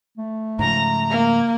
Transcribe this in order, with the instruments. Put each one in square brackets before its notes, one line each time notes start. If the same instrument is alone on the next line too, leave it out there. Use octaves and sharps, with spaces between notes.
[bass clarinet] A3
[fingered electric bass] G#2 C#3 F3 [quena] A#5
[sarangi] A#3